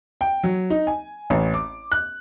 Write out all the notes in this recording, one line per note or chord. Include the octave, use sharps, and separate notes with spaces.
G5
F#3
D#4
G#5
A1
D6
F#6